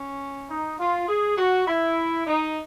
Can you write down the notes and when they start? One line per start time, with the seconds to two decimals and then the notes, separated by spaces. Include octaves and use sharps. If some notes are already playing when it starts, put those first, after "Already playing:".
Already playing: C#4
0.49 D#4
0.79 F4
1.09 G#4
1.38 F#4
1.68 E4
2.27 D#4